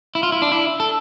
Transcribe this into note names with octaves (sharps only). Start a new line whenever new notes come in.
E4
F4
E4
D4
E4
A4